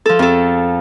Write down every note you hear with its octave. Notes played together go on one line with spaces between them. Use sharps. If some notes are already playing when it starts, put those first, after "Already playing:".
F3 A4
F2 A4